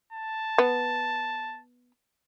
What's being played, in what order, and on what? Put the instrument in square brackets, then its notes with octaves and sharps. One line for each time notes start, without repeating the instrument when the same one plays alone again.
[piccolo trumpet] A5
[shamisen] B3